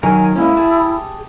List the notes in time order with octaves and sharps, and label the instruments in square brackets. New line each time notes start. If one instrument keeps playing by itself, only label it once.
[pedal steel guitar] D#3 F#3 A#4 [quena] G#5
[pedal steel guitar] G#3 A#3 C#4 [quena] E4
[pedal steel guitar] G4 G#4 A5